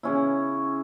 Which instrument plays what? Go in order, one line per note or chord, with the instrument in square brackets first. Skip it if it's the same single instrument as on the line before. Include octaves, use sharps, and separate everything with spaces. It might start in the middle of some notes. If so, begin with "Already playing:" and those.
[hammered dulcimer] C#3 C#4 E4